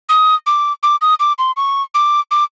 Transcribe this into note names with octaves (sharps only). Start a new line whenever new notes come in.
D#6
D6
D6
D#6
D6
C6
C#6
D6
D6